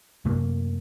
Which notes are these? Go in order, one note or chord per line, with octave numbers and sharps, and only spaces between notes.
F#2 C3 A3 A#3